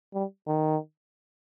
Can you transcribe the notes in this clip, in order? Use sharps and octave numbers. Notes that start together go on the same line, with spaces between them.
G3
D#3